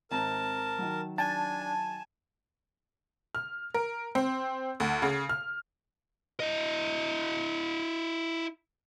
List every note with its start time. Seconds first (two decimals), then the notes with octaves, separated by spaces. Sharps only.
0.11 G#1 C4 A#4 A5 A#5
0.78 D#3 F#3
1.18 D4 G#5 A5
3.35 F6
3.74 A#4
4.15 C4
4.80 D2
5.02 C#3
5.29 F6
6.40 E4 D#5